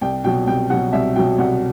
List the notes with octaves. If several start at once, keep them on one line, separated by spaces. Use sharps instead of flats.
C2 G5
B2 F#3 G5
C2 G5
B2 F#3 F#5
C2 E5
B2 F#3 G5
C2 F#5